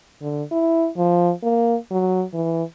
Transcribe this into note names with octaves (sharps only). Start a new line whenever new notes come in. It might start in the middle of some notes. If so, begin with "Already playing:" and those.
D3
E4
F3
A#3
F#3
E3